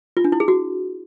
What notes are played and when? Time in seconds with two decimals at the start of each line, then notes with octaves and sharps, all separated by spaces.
0.17 F4
0.24 D4
0.32 E4
0.40 G#4
0.48 F#4